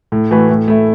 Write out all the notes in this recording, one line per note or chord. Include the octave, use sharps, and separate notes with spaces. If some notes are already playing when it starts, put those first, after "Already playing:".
A2
E3 A3 F#4 B4
A2
A3 E4